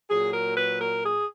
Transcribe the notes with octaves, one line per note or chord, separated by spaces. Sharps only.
A#2 F#3 G#4
A#4
B4
A#4
G#4